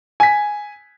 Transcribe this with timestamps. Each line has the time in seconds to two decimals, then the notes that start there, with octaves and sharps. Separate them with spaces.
0.20 G#5 B6